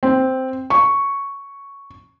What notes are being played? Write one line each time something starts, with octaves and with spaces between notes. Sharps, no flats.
C4
C#6